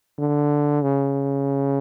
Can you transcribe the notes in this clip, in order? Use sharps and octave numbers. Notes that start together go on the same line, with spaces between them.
D3
C#3